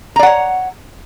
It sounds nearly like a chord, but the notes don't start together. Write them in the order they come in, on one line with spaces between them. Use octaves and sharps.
A#5 D5 F#5 C#5